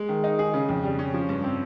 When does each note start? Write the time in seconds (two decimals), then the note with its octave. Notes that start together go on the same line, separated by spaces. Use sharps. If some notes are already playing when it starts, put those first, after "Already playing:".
Already playing: G#3
0.09 D#3
0.24 D#4
0.39 G#4
0.54 C#3
0.69 F2
0.84 G3
0.99 C#4
1.14 F3
1.29 G2
1.44 C4